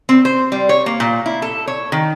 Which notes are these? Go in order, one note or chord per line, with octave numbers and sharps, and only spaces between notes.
C4
C5
G3
C#5
A#3
A#2
E4
A4
C#5
D#3